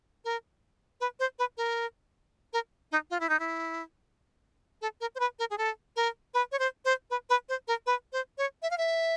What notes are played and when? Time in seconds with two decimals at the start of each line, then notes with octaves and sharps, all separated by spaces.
0.25 A#4
1.00 B4
1.19 C5
1.39 B4
1.57 A#4
2.53 A#4
2.92 D#4
3.10 F4
3.20 E4
3.29 D#4
3.39 E4
4.81 A4
5.01 A#4
5.15 C5
5.20 B4
5.39 A#4
5.50 G#4
5.58 A4
5.96 A#4
6.34 B4
6.52 C#5
6.59 C5
6.85 C5
7.10 B4
7.29 B4
7.49 C5
7.67 A#4
7.86 B4
8.12 C5
8.38 C#5
8.62 E5
8.71 F5
8.78 E5